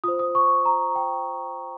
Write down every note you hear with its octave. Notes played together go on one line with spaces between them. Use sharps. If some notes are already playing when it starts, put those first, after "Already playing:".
F4 C5 D#6
D#6
C#6
A#5
G5